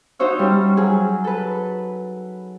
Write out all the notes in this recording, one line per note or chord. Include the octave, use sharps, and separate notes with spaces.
D#4 F#4 C5 C#5 E5
G3 C#4
F#3 G#4
A4 B4